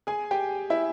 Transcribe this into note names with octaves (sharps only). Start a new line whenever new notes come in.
G#4 G#5
G4 G5
E4 E5